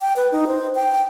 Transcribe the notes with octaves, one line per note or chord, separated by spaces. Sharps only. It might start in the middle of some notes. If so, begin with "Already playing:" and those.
G5
B4
D#4
C5
G5